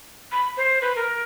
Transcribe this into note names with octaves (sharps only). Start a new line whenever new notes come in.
B5
C5
B4
A#4